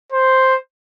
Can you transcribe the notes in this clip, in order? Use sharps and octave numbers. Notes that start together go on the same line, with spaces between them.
C5